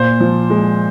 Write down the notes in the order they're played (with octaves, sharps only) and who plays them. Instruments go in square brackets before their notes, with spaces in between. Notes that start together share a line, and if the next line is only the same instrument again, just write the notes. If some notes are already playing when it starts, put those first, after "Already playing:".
Already playing: [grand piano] A#2 C5
F3
G#3